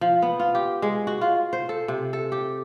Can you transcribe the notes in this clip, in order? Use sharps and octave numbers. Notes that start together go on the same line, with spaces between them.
F3
B3
F4
G4
G#3
F#4
F4
C5
A4
C3
A4
G4